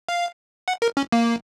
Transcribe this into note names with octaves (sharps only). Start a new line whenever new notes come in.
F5
F#5
A#4
C#4
A#3